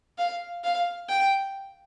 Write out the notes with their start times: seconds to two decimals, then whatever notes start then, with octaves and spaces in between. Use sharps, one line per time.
0.18 F5
0.63 F5
1.08 G5